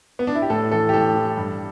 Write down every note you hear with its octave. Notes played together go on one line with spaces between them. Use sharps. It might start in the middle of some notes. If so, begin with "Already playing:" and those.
B3
D4
E4
G4
A2 A4
E3 A4
G4
A2 A4
E3
G2